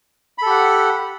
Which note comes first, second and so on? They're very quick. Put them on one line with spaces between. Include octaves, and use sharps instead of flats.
B5 A4 G4 F#5